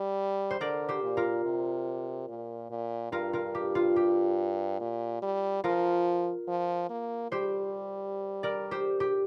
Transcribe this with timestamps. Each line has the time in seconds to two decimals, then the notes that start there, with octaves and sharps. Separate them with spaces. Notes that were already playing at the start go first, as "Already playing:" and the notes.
Already playing: G3
0.51 C5
0.61 D3 A#4 D5
0.89 G4 C5
1.03 A#2
1.17 F4 A#4
1.45 C3
2.29 A#2
2.70 A#2
3.12 G2 F4 A#4
3.33 F4 A#4
3.55 G4
3.75 F4
3.96 G4
4.80 A#2
5.22 G3
5.64 F3 F4 A#4
6.48 F3
6.90 A#3
7.32 G3 G4 C5
8.43 A#4 D5
8.71 G4 C5
9.00 G4